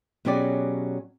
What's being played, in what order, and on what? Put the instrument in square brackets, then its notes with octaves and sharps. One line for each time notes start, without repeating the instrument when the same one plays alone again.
[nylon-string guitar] B2 F#3 C#4 G4 G#4 D5